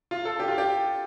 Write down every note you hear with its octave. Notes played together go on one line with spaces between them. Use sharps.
F4
A4
G4
F4
G4